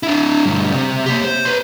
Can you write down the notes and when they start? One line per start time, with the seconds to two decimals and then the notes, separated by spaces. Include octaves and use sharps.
0.03 D4 E4
0.45 D2 G2
0.73 C3
1.06 A#3 G4
1.25 C5
1.45 B4 C6